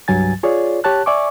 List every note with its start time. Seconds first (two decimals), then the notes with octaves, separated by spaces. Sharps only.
0.08 C2 G2 F#3 G#5 A6
0.43 F4 G#4 C#5 D5
0.84 G4 C#5 A5 F#6
1.06 D5 E5 G#5 C#6 D6